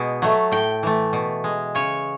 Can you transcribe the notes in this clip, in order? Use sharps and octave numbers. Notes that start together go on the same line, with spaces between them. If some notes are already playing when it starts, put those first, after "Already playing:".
Already playing: B2 G#3
F#3 A3
A2 G5
E3 A3
B2
G#3
C#3 C#5